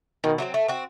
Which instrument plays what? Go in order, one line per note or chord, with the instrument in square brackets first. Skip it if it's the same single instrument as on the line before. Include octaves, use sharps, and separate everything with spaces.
[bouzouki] B2 [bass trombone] D#3
[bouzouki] F#3 A3 C4
A3
C4 F#4